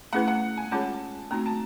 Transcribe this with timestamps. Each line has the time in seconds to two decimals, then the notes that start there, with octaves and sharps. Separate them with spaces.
0.13 A3 C#4 E4 G#4 B4 F#5
0.28 F#5
0.57 G#5
0.72 G#3 C#4 F4 G#4 C#5 A5
1.31 A3 C4 D#4 F#4 A#5
1.46 A5